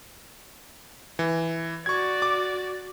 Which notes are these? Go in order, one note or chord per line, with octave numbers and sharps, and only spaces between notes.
E3
F#4 D5 C#6 G#6
D6